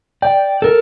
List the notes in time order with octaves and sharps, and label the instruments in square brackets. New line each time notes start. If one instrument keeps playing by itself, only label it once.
[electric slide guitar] D5 [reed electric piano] G5
[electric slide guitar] A4 A#4